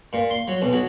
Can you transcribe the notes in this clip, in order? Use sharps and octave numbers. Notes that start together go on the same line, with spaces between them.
A#2
C6
F#3
B1
F#3